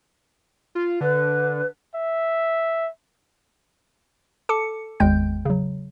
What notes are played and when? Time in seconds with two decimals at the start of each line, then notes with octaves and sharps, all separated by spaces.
0.75 F4
1.01 D3 B4
1.95 E5
4.49 A4 A5 D6 C#7
5.00 G#1 E2 G#3 G5 G6
5.45 C#3 F#3